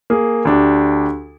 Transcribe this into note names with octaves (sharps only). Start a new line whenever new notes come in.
A#3 G#4
D2 D4 G4